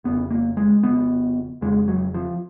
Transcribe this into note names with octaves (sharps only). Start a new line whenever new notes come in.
F1 F2 C#3 B3
A#3
G#3
F1 F2 C#3 B3
F1 F2 C#3 G#3
F#3
F3